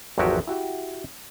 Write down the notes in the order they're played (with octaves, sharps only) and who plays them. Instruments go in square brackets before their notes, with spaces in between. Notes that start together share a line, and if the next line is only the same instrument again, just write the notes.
[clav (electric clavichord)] G#1 E2 F3 F#3 F#4 G4
E4 F#4 G4 E5